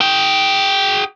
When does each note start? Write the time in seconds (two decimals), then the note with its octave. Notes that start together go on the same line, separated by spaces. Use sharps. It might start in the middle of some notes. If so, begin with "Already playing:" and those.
0.01 G#4 G5